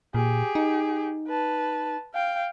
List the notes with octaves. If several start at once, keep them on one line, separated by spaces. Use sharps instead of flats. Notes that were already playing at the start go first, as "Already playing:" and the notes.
A#2 G4 G#4
D#4
B4 A5
F5 G5